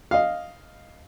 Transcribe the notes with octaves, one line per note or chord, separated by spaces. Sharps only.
D#5 F5